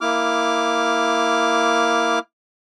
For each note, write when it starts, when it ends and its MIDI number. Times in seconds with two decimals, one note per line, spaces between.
0.01 2.19 58
0.01 2.19 64
0.01 2.19 86
0.01 2.19 89